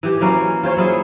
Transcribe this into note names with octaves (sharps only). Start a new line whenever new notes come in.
E3 G4
E3 F#3 A#3 C#4
F4 C5 C#5 F5
F#3 E4 F4 G#4